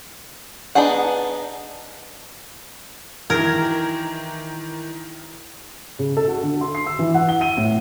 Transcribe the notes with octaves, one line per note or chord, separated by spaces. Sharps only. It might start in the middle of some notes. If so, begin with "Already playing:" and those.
B3 D4 D#4 G#4 F#5
D#3 E3 A#4 G#6
C#3
A4
F#4
D3
C6
C7
E6
E3
F#5
G7
D#7
A2